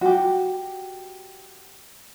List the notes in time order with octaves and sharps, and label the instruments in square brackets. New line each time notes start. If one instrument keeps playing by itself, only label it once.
[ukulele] F#4 G4